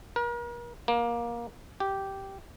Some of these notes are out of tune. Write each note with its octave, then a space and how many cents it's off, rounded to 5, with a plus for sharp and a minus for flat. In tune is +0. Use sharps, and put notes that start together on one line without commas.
A#4 +40
A#3 +20
G4 -10